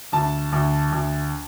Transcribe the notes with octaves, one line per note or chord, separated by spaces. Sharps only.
D2 A5
D2
D2